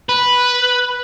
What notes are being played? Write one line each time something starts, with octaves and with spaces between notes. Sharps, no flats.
B4